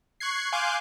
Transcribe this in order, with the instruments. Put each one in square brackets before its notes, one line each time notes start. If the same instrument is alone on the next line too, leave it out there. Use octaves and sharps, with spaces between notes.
[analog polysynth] C#6 F#6 G#6 C7
F5 G#5 C6 D6 F#6 G6